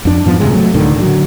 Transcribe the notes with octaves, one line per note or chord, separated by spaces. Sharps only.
F2 D4
G#2 F3 B3
D2 C3 D#3 G#3
F#3 A3
C#2 A2 D3 D#3
D3 F3 F#3